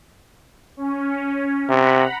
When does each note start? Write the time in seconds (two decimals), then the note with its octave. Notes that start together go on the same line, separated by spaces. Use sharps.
0.77 C#4
1.69 C3 F#5 A#5 B5